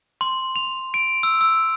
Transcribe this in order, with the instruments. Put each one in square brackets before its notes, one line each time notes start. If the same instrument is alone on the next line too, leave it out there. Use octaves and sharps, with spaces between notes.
[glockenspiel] C6
F7
D7
E6
E6